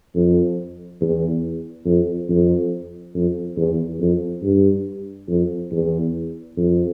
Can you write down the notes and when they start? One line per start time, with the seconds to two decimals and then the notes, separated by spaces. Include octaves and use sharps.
0.15 F2
1.01 E2
1.86 F2
2.29 F2
3.15 F2
3.57 E2
4.00 F2
4.43 G2
5.28 F2
5.71 E2
6.57 F2